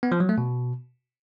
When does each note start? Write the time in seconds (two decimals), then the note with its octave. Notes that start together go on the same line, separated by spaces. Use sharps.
0.03 B3
0.12 F3
0.20 F#3
0.29 A3
0.38 B2